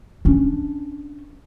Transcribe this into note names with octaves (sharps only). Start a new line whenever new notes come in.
C#4 D4